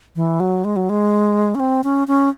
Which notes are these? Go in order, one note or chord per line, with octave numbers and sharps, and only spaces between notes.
E3
F#3
G#3
F#3
G#3
C#4
C4
C#4
C#4